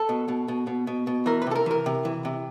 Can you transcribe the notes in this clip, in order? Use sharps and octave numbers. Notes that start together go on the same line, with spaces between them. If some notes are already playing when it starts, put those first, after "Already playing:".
Already playing: A4
B2
B2
B2
B2
B2
B2
E3 A#4
B4
C3 A4
A#4
E3 A#4
C3
E3
C3